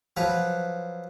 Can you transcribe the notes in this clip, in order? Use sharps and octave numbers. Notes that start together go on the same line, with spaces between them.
F3 F#3 B4